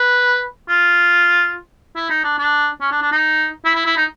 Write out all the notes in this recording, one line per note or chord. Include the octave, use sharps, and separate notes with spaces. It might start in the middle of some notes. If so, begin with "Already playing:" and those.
Already playing: B4
F4
E4
D#4
D4
D4
C#4
D4
D4
D#4
E4
E4
E4
D#4